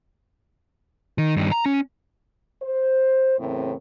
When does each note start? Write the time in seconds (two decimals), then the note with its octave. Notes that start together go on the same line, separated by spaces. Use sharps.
1.18 D#3
1.37 G2 D#3
1.52 A#5
1.66 C#4
2.63 C5
3.39 E2 A2 C#3 C4 A#4